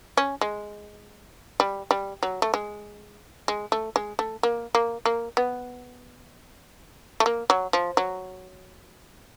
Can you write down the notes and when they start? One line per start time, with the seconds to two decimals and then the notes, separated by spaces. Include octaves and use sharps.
0.17 C#4
0.41 G#3
1.60 G3
1.91 G3
2.23 F#3
2.42 A3
2.54 G#3
3.48 G#3
3.72 A3
3.96 G#3
4.19 A3
4.43 A#3
4.75 A#3
5.05 A#3
5.37 B3
7.20 A3
7.26 A#3
7.50 F#3
7.73 F3
7.97 F#3